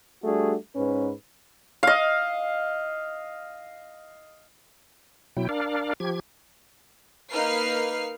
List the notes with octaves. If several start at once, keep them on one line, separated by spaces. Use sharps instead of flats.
G3 A3 D4 F#4 G#4
G#2 C#4 B4
D#5 F5
B2 F#3 E4 G5
D4 A#4 D5 F5
F3 G4 G#6
A#3 D#4 B4 F6 C7